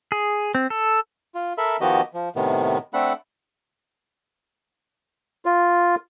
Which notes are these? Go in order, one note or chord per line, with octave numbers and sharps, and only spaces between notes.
G#4
C4
A4
F4
A4 A#4 E5 B5 E6
D#3 F3 B3 F#4 G4 D#5
F3
A2 C3 D#3 B3
A3 C4 D4 A4 F#5 B5
F4